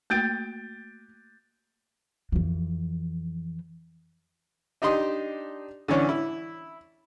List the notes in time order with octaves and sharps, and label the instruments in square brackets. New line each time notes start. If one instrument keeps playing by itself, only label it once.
[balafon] A3 A#3 F#4 [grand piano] G6 A6 D7
[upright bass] F2 E3
[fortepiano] D4 D#4 G4 D#5 C6
D3 E3 C#4 D4
E4